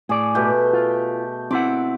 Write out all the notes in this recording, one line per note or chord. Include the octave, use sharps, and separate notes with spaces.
A2 G#4 D5
B2 A3 G4
F4
C4 E4 F#5 D6